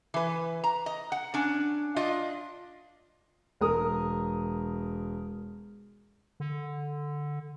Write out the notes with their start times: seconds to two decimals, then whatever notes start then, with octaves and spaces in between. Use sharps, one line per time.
0.14 E3 B4
0.64 A#5
0.86 D#5
1.12 F#5
1.34 C#4 D4
1.96 D4 F4 D#5
3.61 E1 A#4 D#6
6.40 D3